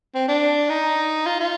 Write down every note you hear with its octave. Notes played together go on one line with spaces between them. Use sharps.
C4
D4
D#4
F4
F4